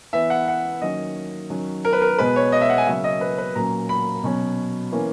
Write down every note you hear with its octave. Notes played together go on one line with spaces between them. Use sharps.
E3 B3 E5
F#5
F#5
D#3 F#3 A#3 C#4 D#5
D#3 F#3 C#4
A#4
B4
A#4
B2 G#3 B3 B4
C#5
D#5
E5
F#5
G#5
C#3 F#3 A#3 C#4 E5
D#5
B4
B4
A#2 F#3 A#3 C#4 A#5
B5
B2 F#3 C#4
E3 A#3 C#4